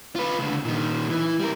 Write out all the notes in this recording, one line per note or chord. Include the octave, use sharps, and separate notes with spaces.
F4 B4
C#2 D3
A#2 D#3
E3
G3 A#4